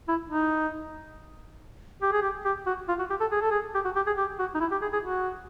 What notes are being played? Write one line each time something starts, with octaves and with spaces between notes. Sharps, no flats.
E4
D#4
G4
G#4
G4
G4
F#4
F4
F#4
G4
A4
G#4
A4
G#4
G4
F#4
G4
G#4
G4
F#4
D#4
E4
G4
G#4
G#4
F#4